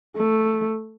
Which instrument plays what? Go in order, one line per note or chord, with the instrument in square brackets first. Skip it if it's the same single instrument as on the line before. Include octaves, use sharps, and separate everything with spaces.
[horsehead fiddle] A3